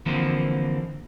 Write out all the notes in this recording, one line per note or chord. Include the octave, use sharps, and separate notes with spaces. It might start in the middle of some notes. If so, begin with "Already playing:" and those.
D3 E3 F3 A#3 C4